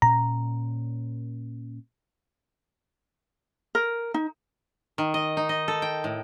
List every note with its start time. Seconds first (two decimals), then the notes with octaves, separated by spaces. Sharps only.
0.02 A#2 C4 C#4 A#5
3.75 A#4
4.14 D#4
4.98 D#3
5.14 D#5
5.37 D#4
5.49 D#5
5.68 A4
5.82 G5
6.04 A2